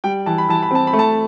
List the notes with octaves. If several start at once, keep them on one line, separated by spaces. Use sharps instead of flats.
G3 G5
E3 A5
B5
E3 A5
B5
C4 A5
B5
A3
A5